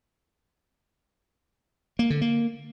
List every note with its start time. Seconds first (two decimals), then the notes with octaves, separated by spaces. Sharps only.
1.99 A#3
2.10 D3
2.21 A#3